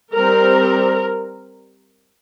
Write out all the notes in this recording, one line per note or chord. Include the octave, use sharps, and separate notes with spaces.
G3 C4 A#4